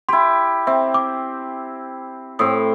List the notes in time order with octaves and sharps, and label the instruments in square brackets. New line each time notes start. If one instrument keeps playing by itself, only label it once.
[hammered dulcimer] E4 G4 [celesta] C6
[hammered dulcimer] C4 [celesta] E5
[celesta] D6
[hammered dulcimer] A2 C4 [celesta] D#6